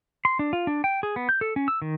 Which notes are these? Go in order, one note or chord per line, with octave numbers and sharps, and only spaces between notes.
C6
D4
F4
D4
G5
G#4
B3
G6
A4
C#4
E6
D#3